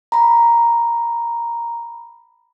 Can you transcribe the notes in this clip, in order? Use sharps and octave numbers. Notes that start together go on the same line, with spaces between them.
A#5 B5